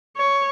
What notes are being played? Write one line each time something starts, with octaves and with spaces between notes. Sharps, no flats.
C#5